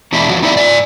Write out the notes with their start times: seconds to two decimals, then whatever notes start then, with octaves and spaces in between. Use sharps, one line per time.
0.12 E2 B2 E3 G#3 D4 E4
0.29 E2 F3 F#4
0.42 B3 D#4 E4 C5 D5 E5
0.55 G#2 D5 G#5